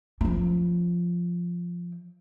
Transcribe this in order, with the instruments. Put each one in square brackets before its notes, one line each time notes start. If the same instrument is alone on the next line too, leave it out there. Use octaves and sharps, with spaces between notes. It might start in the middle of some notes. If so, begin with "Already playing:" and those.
[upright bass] F3 C#4